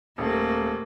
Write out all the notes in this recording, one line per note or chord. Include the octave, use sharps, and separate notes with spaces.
D#1 A3 A#3